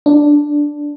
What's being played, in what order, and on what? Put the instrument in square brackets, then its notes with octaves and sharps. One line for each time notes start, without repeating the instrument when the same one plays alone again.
[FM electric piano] D4